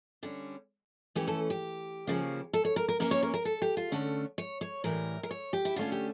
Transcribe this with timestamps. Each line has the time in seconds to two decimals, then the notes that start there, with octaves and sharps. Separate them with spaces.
0.23 D3 G3 C#4
1.15 E3 A3 C#4 G4
1.27 A4
1.50 G4
2.07 C#3 F3 A#3 C#4
2.53 A4
2.65 C#5
2.76 A#4
2.88 A#4
3.00 E3 A#3 C#4 A#4
3.11 C#5
3.23 A#4
3.34 A#4
3.45 A4
3.62 G4
3.77 F4
3.92 D3 A3 C#4
4.38 C#5
4.61 C#5
4.84 A2 E3 G3 A#4
5.23 A#4
5.31 C#5
5.53 G4
5.65 E4
5.76 D3 A3 C#4 F4
5.92 G4